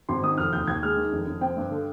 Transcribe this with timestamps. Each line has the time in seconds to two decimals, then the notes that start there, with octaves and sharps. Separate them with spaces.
0.09 G#1 C6
0.23 D#3 D#6
0.37 F1 F6
0.53 D#2 G6
0.68 D#2 G#6
0.83 G#3 F6
0.97 D#3
1.12 F1
1.27 F1
1.41 C4 G5
1.57 G2
1.71 D3